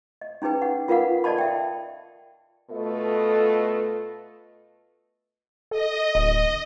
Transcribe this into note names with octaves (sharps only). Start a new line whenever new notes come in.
D#5
C#4 D#4 G#4 B4 G5
F#5
F4 A#4 B4 F5 F#5
A4 D5 D#5 A5 B5
E5 G5
B2 A3 F4 A4 B4 D#5
A4 D#5
D1